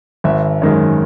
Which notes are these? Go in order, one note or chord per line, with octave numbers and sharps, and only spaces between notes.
G#1 E5
F#2 D#3 G#3